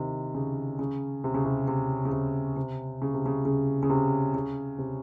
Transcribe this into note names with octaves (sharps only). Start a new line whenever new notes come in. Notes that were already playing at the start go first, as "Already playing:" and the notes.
Already playing: C3 D#3
C#3
C#3
C3
C#3
C3
C3
C#3
C3
C3
C#3
C3
C#3
C#3
C#3
C3
C#3
C3